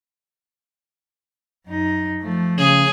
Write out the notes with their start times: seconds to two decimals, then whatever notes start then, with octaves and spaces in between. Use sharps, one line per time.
1.67 F#2 D#4
2.21 F3 A3
2.58 C#3 G#4